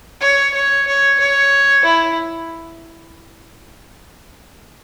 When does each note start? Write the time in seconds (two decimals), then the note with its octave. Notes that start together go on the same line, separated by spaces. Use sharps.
0.21 C#5
0.54 C#5
0.87 C#5
1.19 C#5
1.84 E4